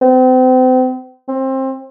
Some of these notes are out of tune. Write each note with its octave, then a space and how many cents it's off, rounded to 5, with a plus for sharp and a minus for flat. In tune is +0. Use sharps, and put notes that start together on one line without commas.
C4 -35
C4 +25